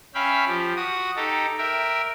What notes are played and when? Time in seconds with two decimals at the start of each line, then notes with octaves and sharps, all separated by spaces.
0.14 C#4 E5 F5 G5 B5
0.47 F3 G4
0.76 F#4 D#6
1.16 D#4 G4 A4
1.58 A#4 E5 G5